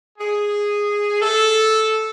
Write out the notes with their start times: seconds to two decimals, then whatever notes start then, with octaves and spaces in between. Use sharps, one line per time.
0.18 G#4
1.20 A4